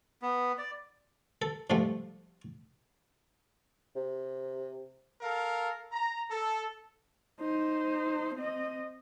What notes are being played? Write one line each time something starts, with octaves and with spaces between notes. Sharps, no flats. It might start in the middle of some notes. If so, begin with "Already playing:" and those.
B3
D5
A4
G#2 C3 F3 G3 A3
C3
A4 A#4 F5
A#5
A4
D#4 C5
C4 D#5